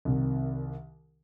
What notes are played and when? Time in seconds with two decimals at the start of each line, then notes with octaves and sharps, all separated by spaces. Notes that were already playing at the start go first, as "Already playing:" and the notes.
0.05 C2 C3 D#3